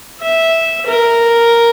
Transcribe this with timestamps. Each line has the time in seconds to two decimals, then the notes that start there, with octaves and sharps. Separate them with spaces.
0.21 E5
0.86 A#4